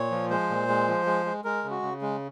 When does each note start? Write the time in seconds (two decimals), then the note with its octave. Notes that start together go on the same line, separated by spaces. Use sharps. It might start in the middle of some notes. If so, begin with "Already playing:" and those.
Already playing: A#2 C#5
0.11 F3
0.30 G#3 C5
0.50 A#2
0.68 G#3
0.88 F3
1.06 G#3
1.25 G#3
1.44 G#3 A#4
1.64 C#3
1.70 F#4
1.82 C#3
2.02 G#3